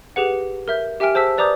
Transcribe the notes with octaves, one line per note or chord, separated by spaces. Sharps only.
G4 G#4 B4 F#5
A#4 E5 G6
G4 E5 G5 G#5 F6 D7
G#4 C5 A5 E6 B6
B4 D5 A#5 D6 D#6 G6